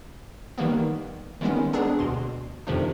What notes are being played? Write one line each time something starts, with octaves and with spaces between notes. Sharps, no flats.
D#3 E3 G3 A#3 B3
D#3 G3 G#3 B3 C#4
B3 C4 D4 G#4
D2 B2 C6
F2 C3 D#3 F3 A3 D4